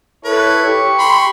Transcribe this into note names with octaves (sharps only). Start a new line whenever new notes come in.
E4 A4 B4 C#5
G4 C#6
B5 C6